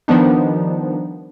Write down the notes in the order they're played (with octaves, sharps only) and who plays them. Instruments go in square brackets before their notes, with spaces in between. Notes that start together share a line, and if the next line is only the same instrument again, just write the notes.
[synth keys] D#3 F3 G3 B3 D4 D#4